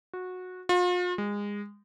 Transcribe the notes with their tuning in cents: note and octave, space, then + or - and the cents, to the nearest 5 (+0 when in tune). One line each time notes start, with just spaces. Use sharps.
F#4 -15
F4 +40
G#3 -25